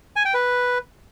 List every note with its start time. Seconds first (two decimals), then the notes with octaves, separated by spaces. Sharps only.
0.16 G#5
0.25 G5
0.34 B4